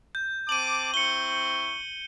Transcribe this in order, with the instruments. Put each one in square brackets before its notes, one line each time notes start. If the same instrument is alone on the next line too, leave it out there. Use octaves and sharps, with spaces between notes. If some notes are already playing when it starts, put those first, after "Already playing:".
[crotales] G6
[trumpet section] C4 A5 D6 [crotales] D#7 F#7
[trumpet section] C4 E4 C#6 [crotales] C#7 G7